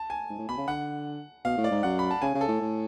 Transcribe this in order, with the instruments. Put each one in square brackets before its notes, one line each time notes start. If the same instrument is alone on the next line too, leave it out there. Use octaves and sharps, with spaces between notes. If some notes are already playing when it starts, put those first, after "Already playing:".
Already playing: [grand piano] A5
G#5
[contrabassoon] G#2
A2
[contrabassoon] B2 [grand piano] B5
[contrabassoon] C#3
[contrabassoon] D3 [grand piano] F#5
[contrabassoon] B2 [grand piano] F5
[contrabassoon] A2
[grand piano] D5
[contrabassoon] G#2
[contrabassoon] F#2 [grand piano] F#5
[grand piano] B5
A5
[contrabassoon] C#3 [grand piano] G#5
[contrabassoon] C#3
[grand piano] A4
[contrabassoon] A2
A2